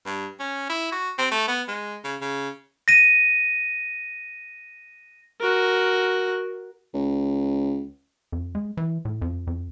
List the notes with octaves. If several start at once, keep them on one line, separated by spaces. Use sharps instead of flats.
G2
C#4
E4
F#4
C4
A3
B3
G#3
C#3
C#3
A#6 D#7
F#4 A#4
C#2
F2
G#3
E3
A2
F2
F2